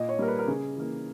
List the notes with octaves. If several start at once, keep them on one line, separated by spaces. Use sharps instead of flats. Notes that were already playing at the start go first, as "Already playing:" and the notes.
Already playing: A#2 D#5
C#5
G3 A#3 A#4
B4
A#4
C#3 G#4
E3 A#3